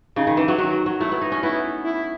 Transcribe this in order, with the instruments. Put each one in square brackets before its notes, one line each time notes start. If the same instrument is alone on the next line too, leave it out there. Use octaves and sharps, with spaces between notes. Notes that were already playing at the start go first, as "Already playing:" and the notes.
[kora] C#3 [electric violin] D#4
[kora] D#3
E3
F#3
[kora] D#3 [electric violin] F#4
[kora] F#3
[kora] A3 [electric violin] E4
[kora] B3
D#4
C#4
[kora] B3 [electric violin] E4
[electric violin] E4